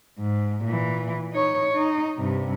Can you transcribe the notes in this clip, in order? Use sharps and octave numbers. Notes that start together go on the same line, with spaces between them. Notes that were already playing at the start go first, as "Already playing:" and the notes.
G#2
A#2 E3
D#4 C#5
D#4
G2 C3